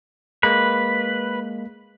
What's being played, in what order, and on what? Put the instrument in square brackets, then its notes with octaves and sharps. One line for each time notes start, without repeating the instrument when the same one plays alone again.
[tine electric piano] G#3 A#3 [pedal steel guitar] B4